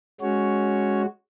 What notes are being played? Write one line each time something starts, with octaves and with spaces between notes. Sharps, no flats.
G#3 C#4 F#4 C#5